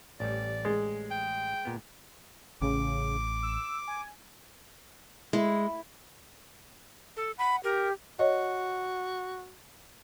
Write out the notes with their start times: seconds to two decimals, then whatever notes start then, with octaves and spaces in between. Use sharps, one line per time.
0.20 A1 G3 D5
0.65 G#3
1.11 G5
1.65 A#2 B3
2.62 A1 C#3 D6
3.43 E6
3.88 G#5
5.33 G#3 E4
7.17 A4
7.38 F#5 B5
7.64 G4 A#4
8.19 F#4 C#5 D#5